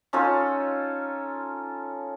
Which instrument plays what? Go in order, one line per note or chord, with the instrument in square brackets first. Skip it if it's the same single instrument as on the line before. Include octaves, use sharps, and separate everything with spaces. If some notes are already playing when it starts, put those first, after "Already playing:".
[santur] C#4 D#4 F4 A4